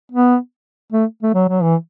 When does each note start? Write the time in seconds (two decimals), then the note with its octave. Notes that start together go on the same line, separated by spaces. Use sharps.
0.12 B3
0.92 A3
1.23 A3
1.34 F#3
1.48 F#3
1.62 E3